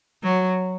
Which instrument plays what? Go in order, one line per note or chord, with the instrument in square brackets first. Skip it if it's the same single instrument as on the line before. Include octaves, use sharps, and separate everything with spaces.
[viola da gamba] F#3